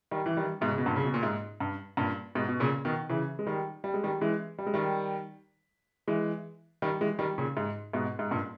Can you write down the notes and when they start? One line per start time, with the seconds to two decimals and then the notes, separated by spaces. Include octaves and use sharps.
0.11 D#3 G3
0.26 E3
0.37 D#3 G3
0.61 G#2 B2
0.72 C#3
0.78 B2
0.86 G2 A#2
0.96 C#3
1.05 B2
1.14 A#2
1.23 G#2
1.60 G2
1.97 G2 A#2
2.35 G#2 B2
2.49 B2
2.60 A#2 C#3
2.85 B2 D#3
3.09 C#3 E3
3.39 G#3
3.47 D#3 G3
3.84 G3
3.94 G#3
4.04 D#3 G3
4.21 E3 G#3
4.58 G3
4.66 G#3
4.74 D#3 G3
6.08 E3 G#3
6.82 D#3 G3
7.01 E3 G#3
7.19 D#3 G3
7.38 A#2 C#3
7.57 G#2
7.93 G#2 B2
8.19 G#2
8.31 G2 A#2